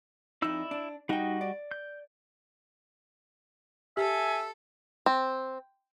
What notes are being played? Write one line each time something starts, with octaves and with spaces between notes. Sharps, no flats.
F2 D#4 E4 D5 E6
D4
G3 D#4 F#4 D#5 G5
D5
G6
G4 A4 E5 G#5
C4